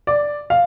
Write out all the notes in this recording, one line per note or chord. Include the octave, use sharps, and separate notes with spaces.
D5
F5